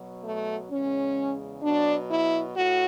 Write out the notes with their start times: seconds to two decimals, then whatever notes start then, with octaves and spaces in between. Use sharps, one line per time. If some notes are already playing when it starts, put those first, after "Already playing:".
Already playing: B2 F#3
0.24 A3
0.70 E2 C#3 G#3 C#4
1.62 B2 F#3 D4
2.09 E4
2.55 A2 F#4